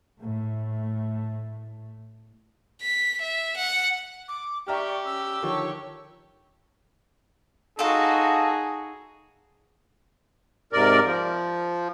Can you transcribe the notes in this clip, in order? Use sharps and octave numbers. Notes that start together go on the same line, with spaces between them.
A2 A3
B6
E5
F#5
D6
G4 D5 E5 G5 A#5 C#6 F6
C#4 E6
D3 D#3 F3 C#5 C#6
D#4 F4 F#4 G#4 A4
G#2 C3 A#4 D5
F3